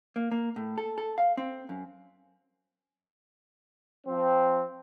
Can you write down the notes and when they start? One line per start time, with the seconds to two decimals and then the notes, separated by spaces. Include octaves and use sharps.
0.16 A#3
0.31 A#3
0.56 A2
0.78 A4
0.98 A4
1.18 F5
1.37 C4
1.69 F#2
4.07 F3 C4